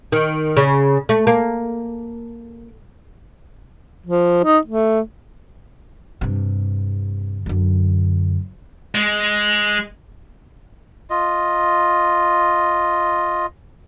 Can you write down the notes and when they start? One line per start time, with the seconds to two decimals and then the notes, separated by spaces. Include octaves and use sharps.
0.12 D#3
0.57 C#3
1.09 A3
1.27 A#3
4.06 F3
4.44 D#4
4.67 A3
6.21 G2 C3
7.46 F#2 D3
8.95 G#3
11.10 F4 D#5